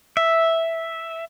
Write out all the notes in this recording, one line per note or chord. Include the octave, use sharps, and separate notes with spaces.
E5